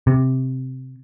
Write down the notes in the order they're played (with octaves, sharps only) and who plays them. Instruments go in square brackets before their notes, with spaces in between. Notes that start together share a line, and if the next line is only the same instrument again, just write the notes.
[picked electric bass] C3